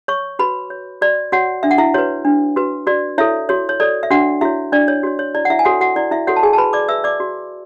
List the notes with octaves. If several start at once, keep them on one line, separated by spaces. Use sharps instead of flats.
C#5 C#6
F#4 B4 B5
C#5
F#4 D5
F#4 C#5 F#5
D4 E5
F#5
E4 E5
F#4 B4 C#5
D4
F#4 B4
F#4 D5
E4 A4 C#5 E5
F#4 C#5
C#5
A4 C#5 D5
E5
D4 F#4 F#5
E4 F#4 C#5 E5
D4 D5
C#5
F#4 C#5
C#5
E4 D5
F#5
E4 E5
G#5
F#4 A4 C#5 F#5
F#4 F#5
E4 D5
E4 E5
F#4 A4 C#5 F#5
A5
G#4 G#5
A5
F#4 B4 B5
D5 D6
B4 E5 E6
D5 D6
F#4